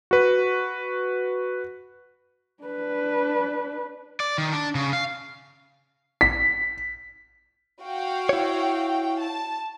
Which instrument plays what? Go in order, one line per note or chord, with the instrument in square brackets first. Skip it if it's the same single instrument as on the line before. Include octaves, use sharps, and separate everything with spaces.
[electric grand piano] F#4 B4
[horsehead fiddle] D4 B4
[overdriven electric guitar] D5
D#3
D4
C#3
F5
[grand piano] B6
[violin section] F#4 F5 G5
[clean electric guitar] E4 C#5
[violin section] A5